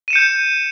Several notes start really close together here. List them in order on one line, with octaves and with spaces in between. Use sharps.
D#7 E7 C#7 G6